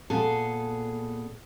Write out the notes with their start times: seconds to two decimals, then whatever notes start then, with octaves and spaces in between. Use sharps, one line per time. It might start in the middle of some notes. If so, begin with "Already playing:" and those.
0.10 A#2 B3 G#4 A4